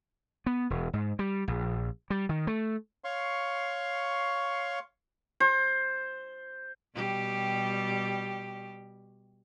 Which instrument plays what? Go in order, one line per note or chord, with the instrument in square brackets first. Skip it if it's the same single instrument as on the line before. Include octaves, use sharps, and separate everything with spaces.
[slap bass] B3
E1
G#2
G3
A#1
G3
D#3
A3
[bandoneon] C#5 F5 C6 C#6
[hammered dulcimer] C5
[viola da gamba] B2 G3 G4